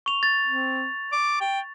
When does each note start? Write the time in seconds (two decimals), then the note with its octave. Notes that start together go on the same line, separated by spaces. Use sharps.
0.06 C#6 F7
0.23 A6
0.46 C4
1.12 D6
1.41 G5